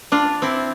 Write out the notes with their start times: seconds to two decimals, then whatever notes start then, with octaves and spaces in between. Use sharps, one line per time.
0.12 D4 F4
0.42 C4 E4